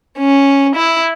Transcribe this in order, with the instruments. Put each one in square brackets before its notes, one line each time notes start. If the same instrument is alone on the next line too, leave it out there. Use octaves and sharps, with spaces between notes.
[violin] C#4
E4